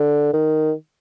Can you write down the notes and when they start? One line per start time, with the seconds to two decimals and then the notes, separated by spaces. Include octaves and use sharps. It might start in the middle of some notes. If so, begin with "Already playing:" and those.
Already playing: D3
0.33 D#3